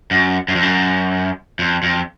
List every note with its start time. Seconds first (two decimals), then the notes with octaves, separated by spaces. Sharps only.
0.11 F#2
0.48 F#2
0.55 F2
0.62 F#2
1.59 F2
1.83 F2